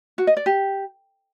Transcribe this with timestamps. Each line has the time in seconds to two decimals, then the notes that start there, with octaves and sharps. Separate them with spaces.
0.18 F#4
0.27 D#5
0.37 D5
0.46 G4